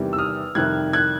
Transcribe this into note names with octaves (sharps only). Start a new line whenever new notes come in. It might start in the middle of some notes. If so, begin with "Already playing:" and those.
Already playing: E2 C3 D#3 G3
E6
D#6 F6
F2 C3 D#3 G3 F#6 G#6
F#6 G#6